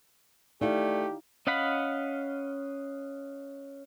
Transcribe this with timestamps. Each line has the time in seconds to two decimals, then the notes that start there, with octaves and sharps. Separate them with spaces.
0.61 A3 D#4 E4 G4 D5 F5
1.47 C#4 D#5 F5 F#5 B5